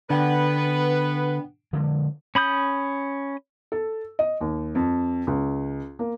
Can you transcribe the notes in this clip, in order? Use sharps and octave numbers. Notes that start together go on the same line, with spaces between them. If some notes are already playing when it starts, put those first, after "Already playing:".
D3 B3 D4 B4 F#5 G5
D3 F3 G#3
C#4 B5 D#6 G6
A4
D#5
D#2
F2
C#2
A#3